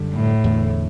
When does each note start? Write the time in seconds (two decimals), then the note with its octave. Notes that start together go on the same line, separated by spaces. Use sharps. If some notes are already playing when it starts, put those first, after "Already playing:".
Already playing: F#2 D3 G3
0.15 A2
0.44 E2 D3 A3